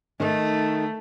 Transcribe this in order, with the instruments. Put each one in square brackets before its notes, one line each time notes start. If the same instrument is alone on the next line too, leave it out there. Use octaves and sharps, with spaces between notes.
[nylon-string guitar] D#3 D#4 [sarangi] A3